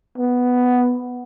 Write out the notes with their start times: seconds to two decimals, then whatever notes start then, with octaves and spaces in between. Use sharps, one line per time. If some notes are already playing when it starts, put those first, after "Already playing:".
0.18 B3